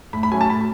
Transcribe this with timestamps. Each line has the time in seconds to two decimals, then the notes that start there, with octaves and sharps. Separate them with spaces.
0.13 A2 B5
0.23 B5
0.31 F#3 A3 C#4 G#5
0.41 A5
0.50 A2 B5